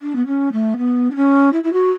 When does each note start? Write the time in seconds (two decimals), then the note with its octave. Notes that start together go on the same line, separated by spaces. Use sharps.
0.02 D4
0.15 B3
0.26 C#4
0.52 A3
0.77 B3
1.10 D4
1.15 C#4
1.52 E4
1.63 E4
1.72 F#4